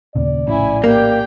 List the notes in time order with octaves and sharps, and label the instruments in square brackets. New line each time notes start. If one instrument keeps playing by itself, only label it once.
[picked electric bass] D#2 A#2 C#3 [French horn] D5
[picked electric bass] A#1 A2 C#4 [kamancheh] E4 G#5
[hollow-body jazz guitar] A#3 [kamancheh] G4 G5